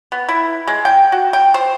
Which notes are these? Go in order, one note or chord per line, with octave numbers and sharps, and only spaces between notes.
B3
E4
G#3
G5
F#4
G5
C5